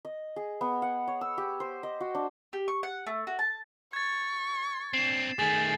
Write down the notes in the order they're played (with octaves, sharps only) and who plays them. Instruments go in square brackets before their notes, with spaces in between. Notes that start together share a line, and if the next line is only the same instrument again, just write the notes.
[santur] D#5
G#4
B3
F#5
C#5
E6
G4
C5
D#5
F#4
D4
[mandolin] G4
C#6
F#5
A3
F#4
A5
[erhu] C#6 [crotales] G#6 A6
[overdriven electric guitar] C4 D4 [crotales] C7 E7
[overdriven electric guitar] D#3 A3 [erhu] G#4 [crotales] A6